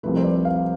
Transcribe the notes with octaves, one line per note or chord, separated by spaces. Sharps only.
C2 C3 F3 A3 B4
C5
D5
F5